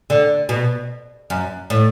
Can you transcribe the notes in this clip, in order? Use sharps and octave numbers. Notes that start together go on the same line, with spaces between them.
D3
B2
F#2
A2